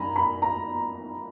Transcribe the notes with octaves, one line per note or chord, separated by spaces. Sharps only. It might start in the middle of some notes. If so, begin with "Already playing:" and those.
Already playing: F#2 G#5 A#5 B5
B5
A#5